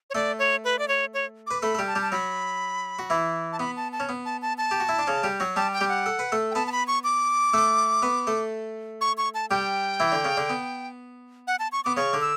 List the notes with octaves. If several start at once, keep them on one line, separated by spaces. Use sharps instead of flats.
C#5
A3 A4 D5
C#5
B4
D5
C#5
C#5
B4 D6
A3 A4 B5
A4
G3 G4
A5
G3 G4
A5
F#3 F#4 B5
F#4
E3 E4
A5
B3 B5
A5
A5
C#4
B3
A5
A5
A5
G4
F#4
E4
D4
C#3 C#4
G3 G4
F#3 F#4
G3 G4 A5
G5
G3 G4
F#5
A4
B4
A3 A4
G5
B3 B4 A5
A5
B5
C#6
D6
A3 A4
B3 B4
A3 A4
C#6
C#6
A5
G3 G4 G5
E3 E4
D3 D4
C#3 C#4
D3 D4
B3
F#5
A5
C#6
B3 D6
C#3 C#4 C#6
D3 D4
E6